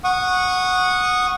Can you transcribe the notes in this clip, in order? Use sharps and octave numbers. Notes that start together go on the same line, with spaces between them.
F#5 C#6 D#6